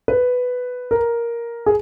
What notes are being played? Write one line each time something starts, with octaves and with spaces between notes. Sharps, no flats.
B4
A#4
G#4